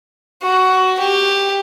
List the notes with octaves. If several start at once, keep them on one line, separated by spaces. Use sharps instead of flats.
F#4
G4